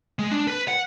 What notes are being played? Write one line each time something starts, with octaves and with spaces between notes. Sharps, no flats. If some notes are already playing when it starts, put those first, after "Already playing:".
G#3
D4
B4
F#5